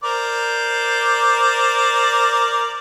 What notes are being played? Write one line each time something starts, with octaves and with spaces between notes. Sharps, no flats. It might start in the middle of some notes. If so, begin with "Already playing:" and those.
A#4 C5 D5